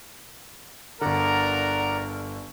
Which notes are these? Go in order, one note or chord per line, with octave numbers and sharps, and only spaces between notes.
G1 D3 A#4 D5 F#5 A#5